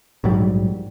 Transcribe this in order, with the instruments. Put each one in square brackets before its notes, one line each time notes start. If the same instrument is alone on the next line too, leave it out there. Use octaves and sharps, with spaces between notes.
[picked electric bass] A#1 G#2 F#3 G3